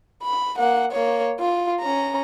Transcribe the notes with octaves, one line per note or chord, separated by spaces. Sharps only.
B5
A#3 F#5
A#3 C#5
F4
C#4 A#5